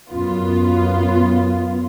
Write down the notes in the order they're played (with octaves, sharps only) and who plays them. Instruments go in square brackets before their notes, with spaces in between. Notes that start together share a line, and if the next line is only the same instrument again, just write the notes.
[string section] F#2 B3 F4